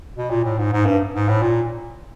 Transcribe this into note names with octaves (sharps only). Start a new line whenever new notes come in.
B2
A#2
A2
G#2
G#2
G2
G#2
A2
A#2